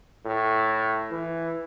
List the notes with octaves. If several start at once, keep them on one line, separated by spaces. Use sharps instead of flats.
A2
E3